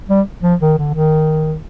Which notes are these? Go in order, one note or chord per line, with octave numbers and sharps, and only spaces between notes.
G3
F3
D#3
D3
D#3